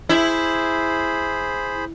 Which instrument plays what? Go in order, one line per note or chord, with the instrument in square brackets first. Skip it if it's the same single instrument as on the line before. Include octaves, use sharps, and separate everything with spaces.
[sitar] E4 [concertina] G#4 C5 B5